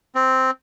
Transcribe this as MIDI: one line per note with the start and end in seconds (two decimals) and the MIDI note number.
0.15 0.51 60